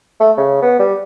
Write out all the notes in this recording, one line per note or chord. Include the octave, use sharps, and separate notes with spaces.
A3
C#3
B3
G3